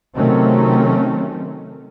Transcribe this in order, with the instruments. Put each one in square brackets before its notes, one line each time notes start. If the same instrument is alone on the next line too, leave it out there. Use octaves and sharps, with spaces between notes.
[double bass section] C3 D#3 F#3 A3 C4 C#4